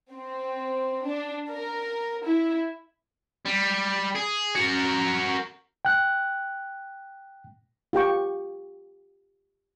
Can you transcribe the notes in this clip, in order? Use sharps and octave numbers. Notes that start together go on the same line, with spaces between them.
C4
D4
A#4
E4
G3
G#4
F#4 A#4
G5 F#6
F4 G4 G5 C#6